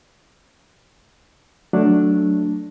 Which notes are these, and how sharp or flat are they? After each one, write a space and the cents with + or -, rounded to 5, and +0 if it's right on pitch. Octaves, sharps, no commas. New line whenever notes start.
F#3 +0 A3 +0 D4 +0